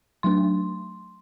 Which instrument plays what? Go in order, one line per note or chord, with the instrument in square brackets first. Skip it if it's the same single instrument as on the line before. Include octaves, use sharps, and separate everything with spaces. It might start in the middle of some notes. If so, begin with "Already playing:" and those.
[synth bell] F#3 A3 D4 C6